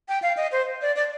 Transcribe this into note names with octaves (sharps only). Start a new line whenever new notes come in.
G5
F5
D#5
C5
D5
D5